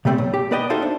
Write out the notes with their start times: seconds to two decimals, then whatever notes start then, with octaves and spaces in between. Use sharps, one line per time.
0.05 C3 G3 A3 A#3 C4
0.18 B1
0.34 G4
0.51 A#3 B4 D5 D#5 G5
0.70 D#4 F#4 A4 C5 E5 F5
0.82 D4